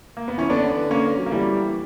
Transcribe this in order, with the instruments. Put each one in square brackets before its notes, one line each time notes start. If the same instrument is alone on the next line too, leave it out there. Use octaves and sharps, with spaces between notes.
[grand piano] A#3
B3
[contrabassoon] E3 [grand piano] C#4
[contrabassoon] D3 [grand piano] B3 D4
[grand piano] A#3 C#4
[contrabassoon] F#3
[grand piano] A#3
[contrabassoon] E3 [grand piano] G3 B3